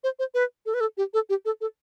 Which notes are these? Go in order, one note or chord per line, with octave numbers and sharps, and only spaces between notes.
C5
C5
B4
A4
B4
A4
G4
A4
G4
A4
A4